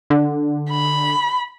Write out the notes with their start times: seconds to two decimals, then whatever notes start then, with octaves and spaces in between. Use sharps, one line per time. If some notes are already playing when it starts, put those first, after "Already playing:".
0.10 D3
0.70 B5